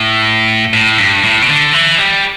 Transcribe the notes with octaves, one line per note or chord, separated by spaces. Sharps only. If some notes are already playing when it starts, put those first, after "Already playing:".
Already playing: A2
A2
G2
A2
B2
D3
E3
G3